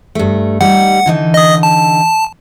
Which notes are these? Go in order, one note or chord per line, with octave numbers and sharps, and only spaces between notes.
G2 A3
G3 D#4 F#5
D3 E3 D#4
D#5 D#6
A5